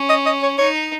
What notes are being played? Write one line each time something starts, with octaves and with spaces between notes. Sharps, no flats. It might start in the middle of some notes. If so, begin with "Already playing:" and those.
Already playing: C#4
D#5
D#5
C#5
D#4 C#5